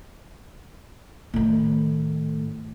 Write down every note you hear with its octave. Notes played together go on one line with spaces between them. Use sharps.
A2 D#3